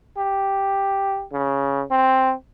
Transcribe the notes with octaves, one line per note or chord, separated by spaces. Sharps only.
G4
C#3
C4